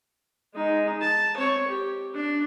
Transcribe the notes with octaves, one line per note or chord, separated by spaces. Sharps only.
G#3 D#4
A5
C4 C#5
G4
D4